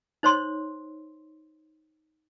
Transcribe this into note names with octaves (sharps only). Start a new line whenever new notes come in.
D#4 C5 C#5 C6